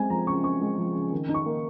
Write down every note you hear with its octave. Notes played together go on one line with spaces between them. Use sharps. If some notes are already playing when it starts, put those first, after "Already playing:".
Already playing: G#3 C4 G#5
F3 A#5
C#3 C#6
C4 C#6
G#3
F3
C#3
D#3
D#4
C#6
A#3